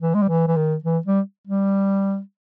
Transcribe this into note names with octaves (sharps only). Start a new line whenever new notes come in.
E3
G#3
G3
E3
E3
D#3
E3
G3
G3